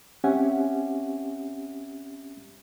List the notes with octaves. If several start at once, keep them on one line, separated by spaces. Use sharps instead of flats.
C4 C#4 G4 E5 F#5 G#5